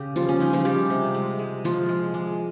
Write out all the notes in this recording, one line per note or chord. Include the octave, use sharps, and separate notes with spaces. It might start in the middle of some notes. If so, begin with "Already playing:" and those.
Already playing: C#3 G4
F3 G3 F4
C#4
C#3 D#4
F3 F4
F3 G3 G4
C3
G#3
G#3
F3 G#3 F4
G#3
G#3